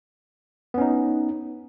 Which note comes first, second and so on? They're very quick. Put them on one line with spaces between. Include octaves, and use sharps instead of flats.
B3 C#4 D#4